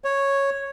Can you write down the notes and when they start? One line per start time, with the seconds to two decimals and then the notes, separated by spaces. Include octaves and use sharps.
0.04 C#5